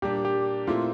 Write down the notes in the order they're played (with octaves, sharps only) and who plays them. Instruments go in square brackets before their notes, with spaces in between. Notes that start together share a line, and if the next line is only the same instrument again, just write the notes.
[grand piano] A#2 G3 D4 [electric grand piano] G4
[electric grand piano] G4
[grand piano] A#2 A3 C4 E4 [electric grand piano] F4